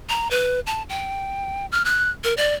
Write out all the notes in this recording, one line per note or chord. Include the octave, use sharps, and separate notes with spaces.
A#5
B4
A5
G5
F6
F#6
A#4
D5